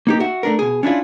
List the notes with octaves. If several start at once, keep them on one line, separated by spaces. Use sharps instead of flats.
A#3 D#4 G4
F#4 E5
A3 D4 A#4
B2 G#4
C#4 D4 E4 F4